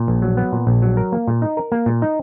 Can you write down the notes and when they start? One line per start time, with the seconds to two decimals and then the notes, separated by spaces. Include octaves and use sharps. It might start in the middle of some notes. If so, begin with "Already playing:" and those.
Already playing: A#2
0.08 A#1
0.22 F#3
0.37 B3
0.52 A#2
0.67 A#1
0.82 F#3
0.97 A#4
1.12 A#3
1.28 A#2
1.42 D#4
1.57 A#4
1.72 A#3
1.86 A#2
2.02 D#4